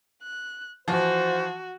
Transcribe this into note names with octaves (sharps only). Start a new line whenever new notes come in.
F#6
E3 F3 F#4 C5